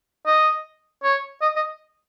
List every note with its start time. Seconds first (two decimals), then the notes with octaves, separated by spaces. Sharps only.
0.27 D#5
1.04 C#5
1.42 D#5
1.56 D#5